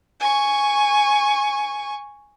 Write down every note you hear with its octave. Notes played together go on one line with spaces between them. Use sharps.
G#5 C#6